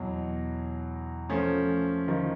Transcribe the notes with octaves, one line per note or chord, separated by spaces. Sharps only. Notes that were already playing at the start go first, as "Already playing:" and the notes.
Already playing: E2 B2 F#3
F3 A3 C#4
D#3 F3